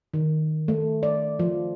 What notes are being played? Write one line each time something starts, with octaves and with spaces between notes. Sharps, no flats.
D#3
A3
D5
F3